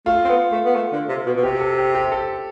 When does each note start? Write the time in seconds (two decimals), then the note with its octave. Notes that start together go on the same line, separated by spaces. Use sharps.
0.06 A3 F4
0.25 C4
0.29 B3
0.52 A3
0.65 B3
0.76 A3
0.92 D3
1.09 C3
1.26 B2
1.37 B2
1.43 C3 G4
1.61 A4
1.78 G4
1.95 G4
2.12 A4